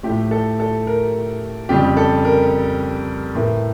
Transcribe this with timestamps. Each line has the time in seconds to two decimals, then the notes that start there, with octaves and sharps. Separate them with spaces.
0.03 A2 F3 A3 G4
0.31 A4
0.60 A4
0.87 A#4
1.69 F2 C#3 G3 G4
1.97 A4
2.25 A#4
3.35 A2 E3 A3 A#4